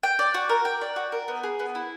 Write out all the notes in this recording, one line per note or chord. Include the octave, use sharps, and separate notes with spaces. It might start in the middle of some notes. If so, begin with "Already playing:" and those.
G5
D5
F#4
A#4
G5
D5
F#4
A#4
B3
G#4
B3
E4